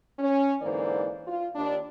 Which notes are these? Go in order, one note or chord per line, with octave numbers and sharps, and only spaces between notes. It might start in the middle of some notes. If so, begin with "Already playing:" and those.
C#4
G#2 D3 E3 A#3 C5 D5
F4
D#2 D4